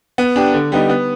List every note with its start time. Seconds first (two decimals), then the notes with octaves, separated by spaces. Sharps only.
0.18 B3
0.36 D4 G4
0.54 D3
0.72 G3 B3 D#4
0.89 B3